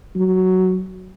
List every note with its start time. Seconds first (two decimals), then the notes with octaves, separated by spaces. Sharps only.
0.16 F#3